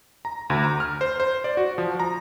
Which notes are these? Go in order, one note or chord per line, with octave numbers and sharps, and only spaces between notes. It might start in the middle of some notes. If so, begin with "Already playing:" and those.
A#5
D2
A#5
F6
C5
C5
D5
F#4
F3
A#5